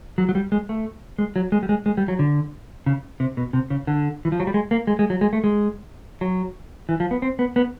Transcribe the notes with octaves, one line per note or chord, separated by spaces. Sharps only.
F#3
F#3
G3
G#3
A3
G#3
F#3
G#3
G3
G#3
G#3
G3
F#3
D3
C#3
C3
B2
C3
C#3
D3
E3
F3
F#3
G3
G#3
A#3
G#3
G#3
F#3
G#3
A3
G#3
F#3
E3
F3
B3
C4
B3
B3